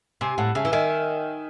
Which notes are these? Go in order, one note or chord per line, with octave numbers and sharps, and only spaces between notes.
C3 G#5 C6
A2 F#5 A5
C#3 E5 G#5
E3
D#3 E5 G#5